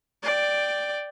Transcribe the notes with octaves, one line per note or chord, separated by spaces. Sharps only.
D5 G5